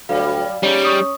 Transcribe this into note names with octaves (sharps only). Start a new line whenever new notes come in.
D2 F#3 G3 F5
G3 C#4 D#4 G#4
C#6 D#6